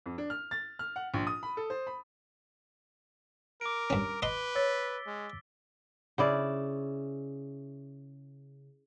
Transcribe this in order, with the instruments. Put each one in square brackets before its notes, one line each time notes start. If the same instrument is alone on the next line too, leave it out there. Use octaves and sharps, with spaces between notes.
[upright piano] F2
D4
F6
A6
F6
F#5
A#1
D#6
B5
A4
C5
B5
[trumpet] A#4 [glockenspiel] D6 D7
[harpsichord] G2 C#4
[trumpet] B4 [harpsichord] D#5 A#5 C6 [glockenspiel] G7
[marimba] C#5 [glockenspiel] E6 A6 B6
[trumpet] G#3
[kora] C#3 E4 D5